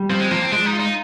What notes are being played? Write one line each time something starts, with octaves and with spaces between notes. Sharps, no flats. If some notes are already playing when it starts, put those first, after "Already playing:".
Already playing: G3
F3 C4
G#3
F3 A#3
C4
G#3 D4
D#4
F4
D#4